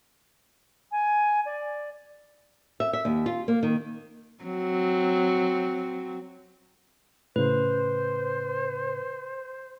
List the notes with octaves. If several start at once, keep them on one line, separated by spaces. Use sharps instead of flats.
G#5
D5
E5
E5
D#2
F4
A#3
D#3
F#3 C4
A2 C#3 B4 C5